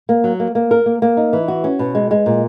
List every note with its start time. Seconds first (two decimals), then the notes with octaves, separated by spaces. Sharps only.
0.09 A#3
0.24 F#3
0.40 A#3
0.55 A#3
0.71 A#4
0.86 A#3
1.02 A#3
1.17 D#4
1.33 E3
1.48 F#4
1.64 C#4
1.79 B2
1.95 G#3
2.11 G#3
2.26 A#2